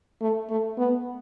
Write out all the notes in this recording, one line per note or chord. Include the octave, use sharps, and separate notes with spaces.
A3
A3
B3